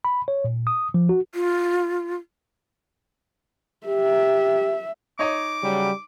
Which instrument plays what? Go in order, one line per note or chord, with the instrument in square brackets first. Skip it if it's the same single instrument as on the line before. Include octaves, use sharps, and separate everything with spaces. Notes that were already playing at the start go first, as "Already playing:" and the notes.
[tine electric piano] B5
C#5
A#2
D#6
F3
F#4
[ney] F4
[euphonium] G4 [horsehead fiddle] E5
[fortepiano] D#4 C#5 D#5 [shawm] D6
[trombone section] C#3 F#3 G3